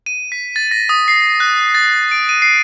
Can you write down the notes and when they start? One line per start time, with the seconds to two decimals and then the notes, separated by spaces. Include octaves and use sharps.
0.06 D#7
0.32 B6
0.56 A6
0.71 A#6
0.89 D#6
1.08 C7
1.40 F#6
1.75 A6
2.11 D7
2.29 D#7
2.42 C7